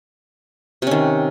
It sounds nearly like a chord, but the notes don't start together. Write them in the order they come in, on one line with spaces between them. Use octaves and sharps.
C3 C#4 D#3